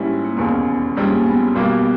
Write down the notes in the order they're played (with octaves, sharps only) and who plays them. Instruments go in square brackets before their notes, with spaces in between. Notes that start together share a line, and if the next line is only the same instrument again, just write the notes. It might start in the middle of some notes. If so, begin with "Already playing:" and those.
Already playing: [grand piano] A#1 G#2 G3 C#4 E4 [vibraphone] G4
[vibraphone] A#3
[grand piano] E1 D#2 C#3 G#3 C#4 [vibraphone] B3
[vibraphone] B3
[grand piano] A#1 G#2 G3 C#4 G#4 [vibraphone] A#3
[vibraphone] B3
[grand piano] B1 B2 G3 A#3